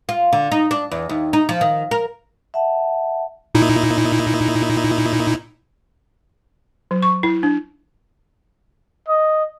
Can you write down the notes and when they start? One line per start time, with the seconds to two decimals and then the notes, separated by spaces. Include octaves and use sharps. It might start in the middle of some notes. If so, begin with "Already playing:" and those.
0.09 F4
0.33 D3
0.52 D#4
0.71 D4
0.91 E2
1.09 D#2
1.33 D#4
1.49 F3
1.61 D#3
1.91 A#4
2.54 E5 F#5 A5
3.55 A#2 D#4 E4
6.91 F#3
7.03 C#6
7.23 E4
7.43 D4
9.08 D#5